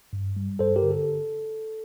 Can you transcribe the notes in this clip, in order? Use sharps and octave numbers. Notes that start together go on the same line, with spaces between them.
G2
G3
G2 A4 C5
G4 A#4
D3
A4